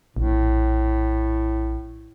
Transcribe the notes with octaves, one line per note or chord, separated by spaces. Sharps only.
A#1 A2